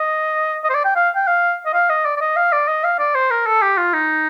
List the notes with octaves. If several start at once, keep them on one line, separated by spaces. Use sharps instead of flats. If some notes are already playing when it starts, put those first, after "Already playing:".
Already playing: D#5
D#5
C5
D5
G5
F5
G5
F5
D#5
F5
D#5
D5
D5
D#5
F5
D5
D#5
F5
D5
C5
A#4
A4
G4
F4
D#4